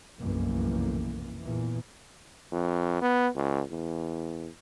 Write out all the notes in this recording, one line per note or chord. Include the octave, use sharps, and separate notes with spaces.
F1 B1 F#2 A2 E3 A#3
E2 A#2 E3
F2
B3
C#2
E2